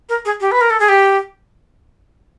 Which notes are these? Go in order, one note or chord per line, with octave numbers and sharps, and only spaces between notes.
A#4
G#4
G4
B4
A#4
A4
G#4
G4